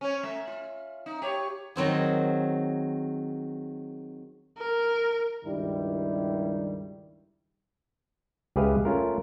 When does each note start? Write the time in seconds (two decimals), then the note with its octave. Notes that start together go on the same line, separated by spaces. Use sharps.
0.01 C#4 C#5
0.23 A3 E5
0.47 F4
1.06 D#4
1.22 G4 C#5
1.76 D#3 F#3 C4 G#4
4.58 A#4
5.44 C#2 G2 D#3 G3 E4
8.56 C#2 G4 G#4 B4 E5 F5
8.85 A3 C#4 F4 A#4